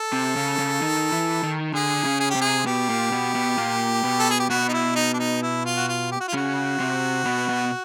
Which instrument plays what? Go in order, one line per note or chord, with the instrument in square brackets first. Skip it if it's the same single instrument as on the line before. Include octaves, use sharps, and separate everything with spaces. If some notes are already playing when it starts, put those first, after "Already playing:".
Already playing: [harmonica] A4
[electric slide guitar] C3 C4
C#3 C#4
C#3 C#4
D#3 D#4
E3 E4
D#3 D#4
[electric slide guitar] D3 D4 [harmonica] G#4
[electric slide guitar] C#3 C#4
[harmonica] G#4
G4
[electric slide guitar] C3 C4
[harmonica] G#4
[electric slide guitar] B2 B3 [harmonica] G4
[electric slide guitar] A#2 A#3
B2 B3
B2 B3
A#2 A#3
B2 B3
[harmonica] A4
G#4
G4
[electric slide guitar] B2 B3 [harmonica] F#4
[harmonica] D#4
E4
D#4
D4
D#4
E4
F4
F#4
F4
G4
F#4
F4
[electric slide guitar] C#3 C#4 [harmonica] F#4
[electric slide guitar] C3 C4
B2 B3
B2 B3